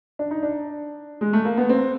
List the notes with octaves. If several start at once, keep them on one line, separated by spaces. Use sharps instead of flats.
D4
D#4
D4
G#3
A3
A#3
B3
C4